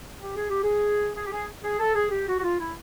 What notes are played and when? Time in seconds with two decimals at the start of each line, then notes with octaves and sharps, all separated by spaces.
0.20 G4
0.35 G#4
0.49 G4
0.63 G#4
1.16 G#4
1.26 G4
1.32 G#4
1.63 G#4
1.80 A4
1.95 G#4
2.11 G4
2.27 F#4
2.38 F#4
2.43 F4
2.59 E4